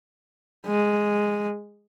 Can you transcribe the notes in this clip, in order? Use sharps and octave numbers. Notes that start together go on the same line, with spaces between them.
G#3